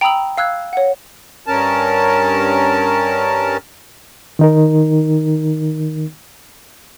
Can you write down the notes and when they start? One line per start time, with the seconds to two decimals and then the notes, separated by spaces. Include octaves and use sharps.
0.01 G5 A#5 B5 D#6 E6 F#7
0.38 F5 E6 F#6 G#6
0.73 C#5 F#5
1.46 G2 C#4 A#4 A5
4.39 D#3 D#4 A#4